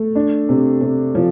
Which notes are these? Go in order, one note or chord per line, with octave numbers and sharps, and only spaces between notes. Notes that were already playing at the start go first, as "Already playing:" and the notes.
Already playing: A3
D4
C3
C3
F3